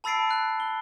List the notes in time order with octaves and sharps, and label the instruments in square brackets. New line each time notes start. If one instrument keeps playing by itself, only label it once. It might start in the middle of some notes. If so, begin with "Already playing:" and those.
[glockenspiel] A5 B5 E6 A6 C7 D7
F#6
G7